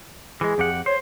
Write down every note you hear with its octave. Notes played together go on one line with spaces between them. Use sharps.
E3 G#3 G#4
F2 G4 F#5
C5 C#5